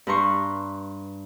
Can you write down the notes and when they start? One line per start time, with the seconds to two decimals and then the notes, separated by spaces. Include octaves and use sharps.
0.07 G2 B4 A#5 C6 C#6